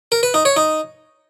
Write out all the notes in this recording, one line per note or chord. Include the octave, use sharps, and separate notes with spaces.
A#4
B4
D#4
C#5
D#4